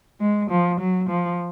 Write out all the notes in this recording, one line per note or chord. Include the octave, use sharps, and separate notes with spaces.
G#3
F3
F#3
F3